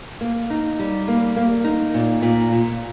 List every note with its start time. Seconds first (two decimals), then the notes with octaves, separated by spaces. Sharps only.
0.21 A#3
0.50 D#4
0.79 G3
1.08 A#3
1.36 A#3
1.64 D#4
1.94 A#2
2.22 A#2
2.52 A#2